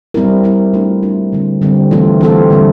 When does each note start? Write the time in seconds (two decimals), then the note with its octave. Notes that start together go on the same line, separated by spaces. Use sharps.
0.14 G3 C4 E4 A#4
0.43 G3 C4 E4 A#4
0.73 A3 D4 F4 A#4
1.03 A3 D4 F4 A#4
1.33 D3 G3 C4
1.62 D3 G3 C4
1.91 E3 A3 C4 F4 A4
2.21 E3 A3 C4 F4 A4
2.50 D3 G3 C4 F4